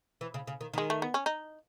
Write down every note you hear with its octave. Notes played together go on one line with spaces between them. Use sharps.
E3
C#3
C#3
D#3
D#3 G#3
A3
B3
C#4
D#4